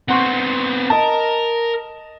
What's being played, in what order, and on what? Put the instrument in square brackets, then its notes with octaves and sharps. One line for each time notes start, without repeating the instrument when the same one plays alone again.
[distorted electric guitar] B3 C4 [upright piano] F#5 C6 C#6
[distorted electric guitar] A#4 [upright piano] D#5 A5